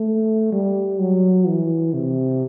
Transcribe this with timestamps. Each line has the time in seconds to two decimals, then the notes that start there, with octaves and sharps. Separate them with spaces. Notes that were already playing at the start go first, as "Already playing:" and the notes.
Already playing: A3
0.52 G3
1.00 F#3
1.46 E3
1.94 C3